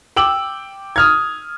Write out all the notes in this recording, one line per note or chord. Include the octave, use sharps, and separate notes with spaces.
G5 D6 E6 F#7
D#6 F6 G#6